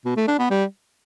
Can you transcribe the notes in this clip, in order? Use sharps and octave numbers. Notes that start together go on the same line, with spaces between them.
B2
A3
D4
B3
G3